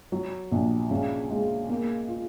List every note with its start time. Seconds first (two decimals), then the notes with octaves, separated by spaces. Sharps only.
0.12 F#3
0.52 A#1
0.91 C#3
1.30 G#3
1.69 A#3
2.08 F4